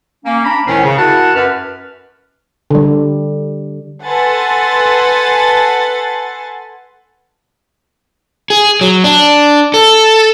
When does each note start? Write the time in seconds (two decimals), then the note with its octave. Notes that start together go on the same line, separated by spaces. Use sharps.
0.24 A#3 C#4
0.45 D4 A#5 B5
0.67 C#2 A2 D#3 C#4 C5 G#5
0.85 C#3
0.98 E4 F#4 A#4 F#5 A5
1.35 F#2 B4 F6
2.71 D3 G3
4.05 A4 B4 F#5 G#5 C6 A6
8.50 G#4
8.81 F#3
9.04 D4
9.74 A4